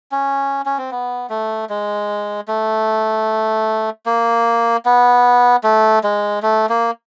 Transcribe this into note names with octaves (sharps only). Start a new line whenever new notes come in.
C#4
C#4
C4
B3
A3
G#3
A3
A#3
B3
A3
G#3
A3
A#3